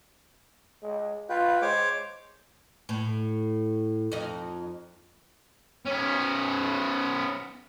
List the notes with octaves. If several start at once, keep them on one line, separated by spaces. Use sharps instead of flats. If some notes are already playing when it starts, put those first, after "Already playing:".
G#3
F4 B4 G5
G#3 C5 C#5 D6
A2
F2 D#4
B3 C#4